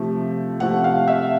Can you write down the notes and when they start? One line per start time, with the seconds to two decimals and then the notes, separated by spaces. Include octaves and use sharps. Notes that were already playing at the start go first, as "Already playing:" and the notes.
Already playing: C3 F3 A3
0.60 C3 F3 A3 F#5
0.84 F5
1.08 E5